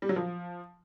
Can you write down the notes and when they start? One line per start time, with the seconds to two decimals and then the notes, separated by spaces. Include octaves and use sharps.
0.02 G3
0.09 F#3
0.16 F3